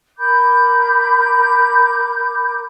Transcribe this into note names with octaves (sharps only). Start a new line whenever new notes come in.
A#4 B5 D6 G6